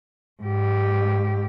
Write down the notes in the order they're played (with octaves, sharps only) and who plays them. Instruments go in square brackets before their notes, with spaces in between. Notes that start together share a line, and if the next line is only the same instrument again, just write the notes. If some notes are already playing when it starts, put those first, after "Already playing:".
[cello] G#2 G4